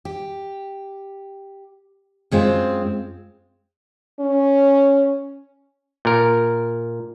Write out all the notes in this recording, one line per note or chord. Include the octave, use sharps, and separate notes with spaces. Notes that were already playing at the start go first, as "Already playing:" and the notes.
G4
F#2 G#3 C4 F4
C#4
A#2 A#4